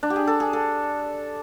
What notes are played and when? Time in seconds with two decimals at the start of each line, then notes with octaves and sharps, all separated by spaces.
0.03 D4
0.10 G4
0.16 G#4
0.27 A4
0.40 G#4
0.53 A4